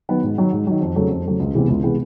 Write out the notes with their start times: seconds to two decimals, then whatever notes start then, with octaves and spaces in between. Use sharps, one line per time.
0.09 D#3 F#3 B3
0.23 G#2
0.38 D#3 F#3
0.52 G#2
0.67 D#3 F#3
0.81 F2
0.96 C#3 F#3 A3
1.10 F2
1.25 C#3 F#3 A3
1.39 C#2
1.55 C3 E3 G#3 B3
1.69 C#2
1.84 C3 E3 G#3 B3